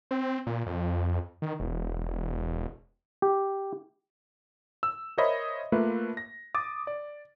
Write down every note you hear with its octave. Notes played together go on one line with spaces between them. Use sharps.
C4
A#2
F2
D#3
E1
G4
E6
A#4 C5 C#5 D#5 E5 B5
A3 A#3 F4 B4 E5
A#6
D6 D#6 A6
D5